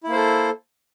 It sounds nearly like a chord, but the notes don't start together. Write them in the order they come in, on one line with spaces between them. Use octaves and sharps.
E4 A#3 C5 A4